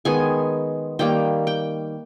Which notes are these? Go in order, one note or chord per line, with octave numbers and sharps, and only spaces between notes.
D#3 G#3 B3 G#5
D#3 G3 A#3 G5
G5